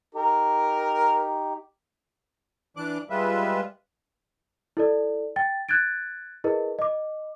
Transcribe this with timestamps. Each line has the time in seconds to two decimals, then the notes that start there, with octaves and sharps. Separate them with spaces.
0.15 D#4 G4 A#4
2.77 E3 D4 D6 F#6
3.10 G3 G#3 F4 B4 E5
4.77 E4 A4 D5
5.36 G5 A6
5.69 F#6 G#6 A6 D7
6.44 E4 G#4 A#4 B4 D#5
6.79 D#5 D6